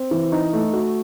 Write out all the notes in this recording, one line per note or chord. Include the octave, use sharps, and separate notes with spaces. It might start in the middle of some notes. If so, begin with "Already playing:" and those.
Already playing: C4
E3
D#4
A3
F#4